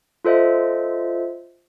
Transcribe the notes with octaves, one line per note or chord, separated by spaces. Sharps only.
F4 A4 C5 D#5 E5